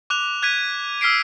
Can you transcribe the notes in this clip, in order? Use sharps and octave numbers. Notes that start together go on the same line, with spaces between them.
D6 F#6 F7
F#6 G#6 B6 D#7
E6 F6 B6 C7 D7